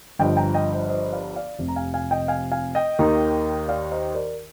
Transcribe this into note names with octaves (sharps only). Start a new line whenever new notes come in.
G1 G2 F3 D#5 G5
G5 A#5
D#5 G5
C5 D#5
C5 D#5
D5 F5
D5 F5
F1 F2 C3
A#5
F5 G#5
F5 G#5
D#5 G5
F5 G#5
F5 G#5
D#5 G5
D#2 D#3 A#3 D#4
D5 F5
C5 D#5
A#4 D5